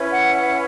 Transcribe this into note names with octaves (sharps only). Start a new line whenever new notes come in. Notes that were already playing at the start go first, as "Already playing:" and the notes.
Already playing: C#4 E4 B4
F#5
F#5